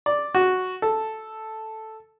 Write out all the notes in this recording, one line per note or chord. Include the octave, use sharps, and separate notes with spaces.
D5
F#4
A4